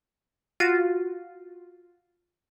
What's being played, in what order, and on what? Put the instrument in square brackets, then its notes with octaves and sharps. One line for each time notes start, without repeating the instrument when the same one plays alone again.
[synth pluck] F4 F#4